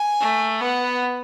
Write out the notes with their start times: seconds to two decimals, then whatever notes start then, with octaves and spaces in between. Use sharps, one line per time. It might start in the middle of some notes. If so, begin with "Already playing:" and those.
Already playing: G#5
0.21 A3
0.61 B3 F#5